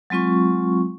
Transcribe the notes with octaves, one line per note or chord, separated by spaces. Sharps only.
F#3 G#3 C4 F4 C#6